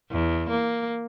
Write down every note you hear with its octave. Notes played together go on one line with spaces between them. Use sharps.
E2
A#3